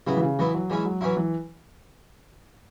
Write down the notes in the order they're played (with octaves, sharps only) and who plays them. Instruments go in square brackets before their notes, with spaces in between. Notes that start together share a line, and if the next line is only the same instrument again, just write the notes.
[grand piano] C#3 [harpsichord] F#3 B3 E4
[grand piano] E3
C#3
[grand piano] E3 [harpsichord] F#3 B3 E4
[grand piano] F#3
[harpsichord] E3 C#4 E4 [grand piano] G#3
[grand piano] F#3
[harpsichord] E3 C#4 E4 [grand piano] F#3
[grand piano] E3